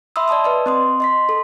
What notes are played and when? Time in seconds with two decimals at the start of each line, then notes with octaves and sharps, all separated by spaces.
0.16 E5 B5 C6 D#6 E6
0.28 D5 D#5 A5 D#6 E6
0.44 B4 D5 D#5
0.66 C4 C6 D#6
1.00 D#5 C6 B6
1.29 A4